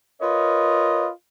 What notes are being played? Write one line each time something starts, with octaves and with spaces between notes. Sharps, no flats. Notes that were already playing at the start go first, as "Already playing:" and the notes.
F4 A#4 B4 C#5 D#5